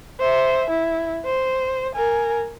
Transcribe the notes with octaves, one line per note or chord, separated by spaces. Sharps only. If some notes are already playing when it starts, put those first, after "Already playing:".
C5 E5
E4
C5
A#4 G#5